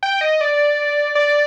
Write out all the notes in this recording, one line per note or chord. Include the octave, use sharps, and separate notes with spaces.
G5
D#5
D5
D5